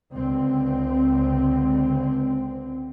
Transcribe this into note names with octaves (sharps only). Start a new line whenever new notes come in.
C#2 D3 C4